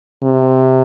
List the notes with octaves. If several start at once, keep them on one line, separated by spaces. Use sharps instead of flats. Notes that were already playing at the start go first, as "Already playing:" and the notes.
C3